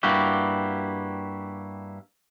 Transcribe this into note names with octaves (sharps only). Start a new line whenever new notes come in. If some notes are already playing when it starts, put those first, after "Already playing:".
G2 A#3 E4 F#4 G4